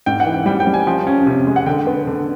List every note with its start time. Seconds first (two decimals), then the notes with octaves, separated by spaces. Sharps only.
0.06 G#2 G5
0.20 F#5
0.26 E3
0.33 G5
0.46 G3 G5
0.60 G5
0.67 G3
0.74 G#5
0.87 F3 G5
1.07 C#4
1.26 C3
1.47 G#3
1.56 F#5
1.66 D3 G5
1.87 B3
2.07 D3